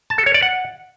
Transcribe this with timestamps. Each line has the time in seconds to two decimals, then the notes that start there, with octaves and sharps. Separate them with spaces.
0.10 A5
0.18 A4
0.26 C#5
0.34 D5
0.42 F#5